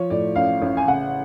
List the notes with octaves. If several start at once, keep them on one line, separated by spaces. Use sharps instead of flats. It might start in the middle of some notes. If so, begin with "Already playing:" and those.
Already playing: F3 C#5
A2 D5
A1 F5
A1
G#5
C#3 F#5